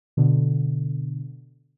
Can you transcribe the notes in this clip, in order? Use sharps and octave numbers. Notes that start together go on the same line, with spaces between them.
B2 D3